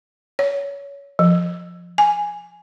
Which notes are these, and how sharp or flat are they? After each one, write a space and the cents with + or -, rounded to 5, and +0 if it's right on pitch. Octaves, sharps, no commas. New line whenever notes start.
C#5 +20
F3 +5
G#5 +0